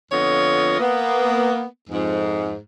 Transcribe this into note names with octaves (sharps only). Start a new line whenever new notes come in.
F2 D3 B3 F4 C#5 D#5
A#3 B3
F2 G#2